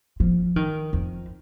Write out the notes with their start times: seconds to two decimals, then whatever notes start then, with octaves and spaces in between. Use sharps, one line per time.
0.20 F3
0.56 D#3
0.93 F2